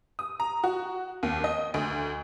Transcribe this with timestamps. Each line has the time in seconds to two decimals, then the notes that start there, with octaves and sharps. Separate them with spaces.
0.19 D#6
0.40 A#5
0.64 F#4
1.23 D#2
1.44 D#5
1.74 D2